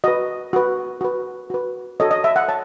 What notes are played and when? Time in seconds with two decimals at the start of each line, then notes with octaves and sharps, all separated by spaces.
0.04 F#4 B4 D#5
0.53 F#4 B4
1.01 F#4 B4
1.50 F#4 B4
2.00 F#4 A4 C#5 D#5
2.11 D#5
2.24 E5
2.36 F#5
2.48 C#5 A5